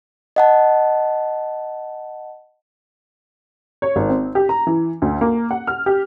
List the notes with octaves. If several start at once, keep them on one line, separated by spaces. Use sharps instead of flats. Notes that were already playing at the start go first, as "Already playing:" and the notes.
D#5 F#5 A5
C#5
G#1
C4
G4
A#5
E3
D2
A#3
F#5
F6
G4